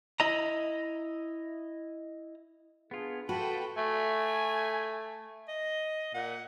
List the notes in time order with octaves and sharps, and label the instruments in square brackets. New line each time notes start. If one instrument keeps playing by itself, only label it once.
[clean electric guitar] E4 D#5 A#5
[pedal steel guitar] B3 F4 [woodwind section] D4 G#4
[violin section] F4 A4 G5 [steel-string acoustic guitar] F#4 [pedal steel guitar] B4 [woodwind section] A5 B5
[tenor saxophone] A3 [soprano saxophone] G#5
[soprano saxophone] D#5
[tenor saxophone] A#2 [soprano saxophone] F#5